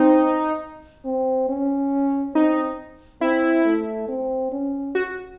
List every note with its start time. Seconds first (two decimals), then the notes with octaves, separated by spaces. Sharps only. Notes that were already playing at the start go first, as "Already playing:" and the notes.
Already playing: C4 D#4
1.05 C4
1.49 C#4
2.35 C4 D#4
3.21 C4 E4
3.65 A3
4.08 C4
4.52 C#4
4.95 F#4